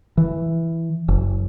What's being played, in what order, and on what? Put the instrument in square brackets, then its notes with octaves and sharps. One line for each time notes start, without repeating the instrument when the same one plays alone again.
[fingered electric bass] E3
F#1